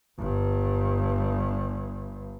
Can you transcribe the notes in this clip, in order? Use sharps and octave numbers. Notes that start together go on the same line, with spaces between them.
G1 G2